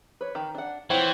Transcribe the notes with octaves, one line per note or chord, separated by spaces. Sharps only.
B4 C#5
D#3
D4 F#5
E3 C4 F4 C5 C#5 F#5 G5